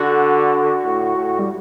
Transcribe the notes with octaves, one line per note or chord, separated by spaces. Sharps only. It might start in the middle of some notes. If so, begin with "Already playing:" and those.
Already playing: D3 F#4
A2
A2
G3